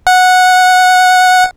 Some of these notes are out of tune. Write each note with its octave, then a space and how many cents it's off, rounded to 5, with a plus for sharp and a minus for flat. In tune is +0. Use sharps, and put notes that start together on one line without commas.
F#5 -10